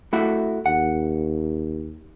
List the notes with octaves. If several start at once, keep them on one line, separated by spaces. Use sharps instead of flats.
A3 E4 F#4
D#2 F#5